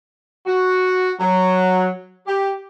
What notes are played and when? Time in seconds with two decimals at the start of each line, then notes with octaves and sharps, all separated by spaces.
0.47 F#4
1.20 F#3
2.27 G4